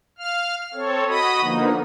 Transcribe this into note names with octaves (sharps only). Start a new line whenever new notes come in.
F5 F6
C4 A4 C#5
F#4 D#5 B5 D#6
D3 F3 A#3 B3 D#4